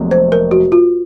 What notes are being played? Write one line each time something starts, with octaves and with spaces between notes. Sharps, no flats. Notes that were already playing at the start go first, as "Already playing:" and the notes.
Already playing: F1 F2 C3 F#3 A#3
C5
A#4
F#4
F4